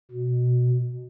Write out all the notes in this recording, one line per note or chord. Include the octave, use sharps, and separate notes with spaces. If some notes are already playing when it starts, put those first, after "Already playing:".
B2